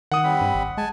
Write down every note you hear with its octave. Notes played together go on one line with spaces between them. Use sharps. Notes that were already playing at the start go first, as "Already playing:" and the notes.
D#3 F#5 D#6
G3 C4 B5
G2
G#1
G#3 G#5 A5